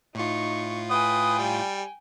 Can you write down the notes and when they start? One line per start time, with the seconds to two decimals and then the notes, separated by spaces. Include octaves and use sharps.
0.15 A2 D#4 F4 C#6
0.90 B4 G5 G#5 D#6
1.38 G3